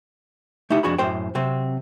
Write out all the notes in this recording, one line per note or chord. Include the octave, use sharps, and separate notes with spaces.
A3 D#4 E4 G4 F#5
F2 D4 F#4 G#4 B5
F#2 A2 C5 G5
C3 F#3 C4